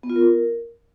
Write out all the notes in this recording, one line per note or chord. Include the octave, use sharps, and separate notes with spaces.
B3
F4
A#4